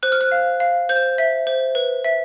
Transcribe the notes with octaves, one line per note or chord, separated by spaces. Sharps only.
C5 F#6
F6
F#6
F5
F5
C5 G6
E5
C5
B4
E5